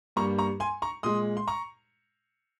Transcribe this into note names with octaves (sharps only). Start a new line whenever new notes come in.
G2 G3 A#3 A#5 C#6
A#5 C#6
G#5 C6
A#5 C#6
A#2 G#3 C6 D#6
C6
A#5 C#6